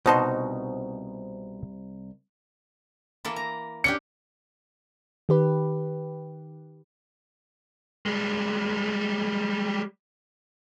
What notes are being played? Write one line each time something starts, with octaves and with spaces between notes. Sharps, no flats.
C2 B2 D#4 F#4 C5 A5 C6
E3 A#3 A4
A#5
C#4 D4 G4 C#7
D#3 G4 B4
G3 G#3